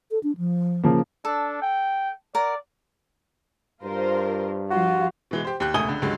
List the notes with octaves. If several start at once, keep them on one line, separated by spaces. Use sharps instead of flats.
A4
D4
F3
C#3 F3 A#3
D4 A4
G5
A#4 D5 F#5
G2 F4 A#4 C5
F3 G3 F4 F#4
B2 E3 G#3
G4 C5
D#2 G4 F#6
E1 C#2 A3 G#5 D#6 G7
C#2 D3
C#2 G2 D3 F#3 G#3